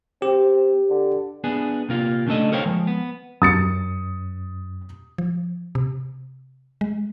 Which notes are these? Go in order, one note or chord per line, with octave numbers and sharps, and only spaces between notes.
C4 G4
D3
B3 D4 G#4
C3 A#3 F4
C#3 A3 D4 A4 D#5
A4 A#4 C5 C#5 F5 G5
F3 G#3
B3
F#2 D#6 A6 C#7
F3
C3
G#3